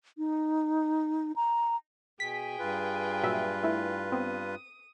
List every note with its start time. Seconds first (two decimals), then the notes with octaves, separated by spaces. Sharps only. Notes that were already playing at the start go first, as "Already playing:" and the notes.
0.18 D#4
1.36 A#5
2.20 B2 G#4 G5 G#5 B6
2.59 G2 F4 B4
3.23 A#2 F#3 E5
3.63 A3 E4
4.12 B3 C4 D#6